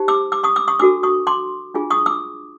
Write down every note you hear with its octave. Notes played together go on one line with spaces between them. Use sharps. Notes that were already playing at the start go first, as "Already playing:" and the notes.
Already playing: D#4 G4 C5
D6 E6
D6 E6
C#6 D#6
D6 E6
C#6 D#6
D4 F#4 A4 D6 E6
C#6 D#6
C6 D6
D4 F4 G#4
C#6 D#6
D6 E6